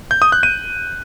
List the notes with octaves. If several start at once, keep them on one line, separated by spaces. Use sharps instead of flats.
G6
D#6
F#6
D#7